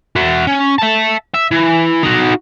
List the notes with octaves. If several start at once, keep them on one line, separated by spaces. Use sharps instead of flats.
F#4 E5
C#4
E5 A5
E5
E3
D#4 F#4